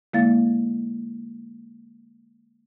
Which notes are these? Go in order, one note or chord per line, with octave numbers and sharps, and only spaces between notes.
D3 G#3 A#3 E4 F5 A6